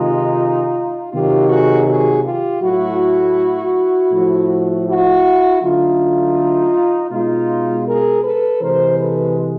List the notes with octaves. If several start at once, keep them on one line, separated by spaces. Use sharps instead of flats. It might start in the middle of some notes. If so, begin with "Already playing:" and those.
Already playing: C3 D#3 G#3 D#4 F4
C3 D#3 F#3 F4 G4
F#4 G#4
F#4 G#4
F4 G4
A2 F#3 A3 E4 F#4
A2 F3 A3
E4 F#4
D3 F#3 A3 D#4 F4
B2 G#3 D#4 F4
G#4 A#4
A4 B4
C3 E3 G#3 A#4 C5
A4 B4